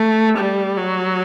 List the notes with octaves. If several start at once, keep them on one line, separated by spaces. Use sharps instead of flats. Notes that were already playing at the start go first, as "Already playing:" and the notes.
Already playing: A3
G3
F#3